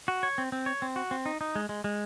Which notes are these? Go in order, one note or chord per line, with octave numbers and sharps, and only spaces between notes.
F#4
C#5
C4
C4
C#5
C4
F#4
C4
D#4
D#4
G#3
G#3
G#3